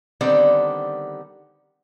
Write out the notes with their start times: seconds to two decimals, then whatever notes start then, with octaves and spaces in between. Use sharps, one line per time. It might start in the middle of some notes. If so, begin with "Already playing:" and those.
0.21 D3 D#3 G3 B3 C4 D5